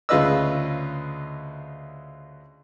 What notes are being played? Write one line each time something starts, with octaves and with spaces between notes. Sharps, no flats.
D2 C#3 F4 B4 D#5 E6